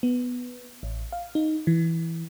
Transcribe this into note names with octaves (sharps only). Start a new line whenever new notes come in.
B3
A1
F5
D#4
E3